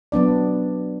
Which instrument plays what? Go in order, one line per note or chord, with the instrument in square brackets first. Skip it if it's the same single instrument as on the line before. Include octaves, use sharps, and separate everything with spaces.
[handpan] F#3 B3 D4 D5